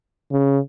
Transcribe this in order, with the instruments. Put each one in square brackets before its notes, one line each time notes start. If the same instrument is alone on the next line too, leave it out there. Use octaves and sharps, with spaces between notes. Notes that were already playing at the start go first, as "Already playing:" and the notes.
[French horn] C#3